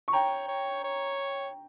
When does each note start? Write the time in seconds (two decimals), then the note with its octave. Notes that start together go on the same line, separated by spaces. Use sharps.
0.08 C#6
0.13 C#5 G5 A#5
0.48 C#5
0.84 C#5